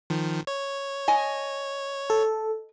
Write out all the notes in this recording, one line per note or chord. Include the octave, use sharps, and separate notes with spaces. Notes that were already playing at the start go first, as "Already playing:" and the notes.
D#3 F3
C#5
D#5 G#5
A4